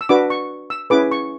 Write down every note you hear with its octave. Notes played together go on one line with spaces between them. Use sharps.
E6
D4 F#4 B4 D6
C#6
E6
C#4 E4 G#4 B4 D6
C#6